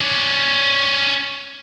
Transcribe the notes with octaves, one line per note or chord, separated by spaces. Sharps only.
C#4 D5